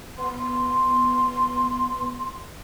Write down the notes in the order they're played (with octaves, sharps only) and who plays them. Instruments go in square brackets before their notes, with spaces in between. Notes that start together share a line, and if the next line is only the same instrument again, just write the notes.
[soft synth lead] B3 [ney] C6